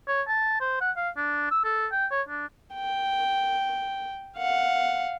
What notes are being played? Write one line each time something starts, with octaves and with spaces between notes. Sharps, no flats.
C#5
A5
C5
F#5
F5
D4
E6
A4
G5
C#5
D4
G5
F5 F#5